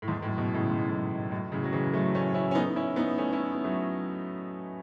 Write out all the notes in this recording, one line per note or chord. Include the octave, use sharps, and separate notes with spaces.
A2
E2 G#2
F#2 A2
G#2 B2
A2 C#3
G#2 B2
F#2 A2
F#2 A2
A2 C#3
F#3
C#3 E3
F#3 A3
A3 C#4
C#4 E4
C#4
B3 D#4
C#4 E4
B3 D#4
A3 C#4
C#4 E4
B3
F#3 A3